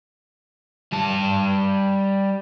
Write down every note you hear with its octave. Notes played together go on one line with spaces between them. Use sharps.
G3 A5